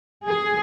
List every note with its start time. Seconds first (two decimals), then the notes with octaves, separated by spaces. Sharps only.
0.24 G#4